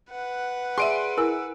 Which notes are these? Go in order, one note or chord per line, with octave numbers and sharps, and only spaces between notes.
B4 F#5
G#4 D5 E5 C6 D7 D#7
E4 A#4 G#5 E6